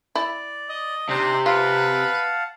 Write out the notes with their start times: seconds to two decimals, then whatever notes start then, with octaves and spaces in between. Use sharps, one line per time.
0.15 E4 D5
0.69 D#5
1.09 C3 D4 D#4 C5
1.46 F4 B4 F5 F#5 A5